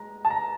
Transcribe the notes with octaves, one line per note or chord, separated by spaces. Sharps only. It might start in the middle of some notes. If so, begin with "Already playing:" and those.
Already playing: G#3 A#5
A5
A#5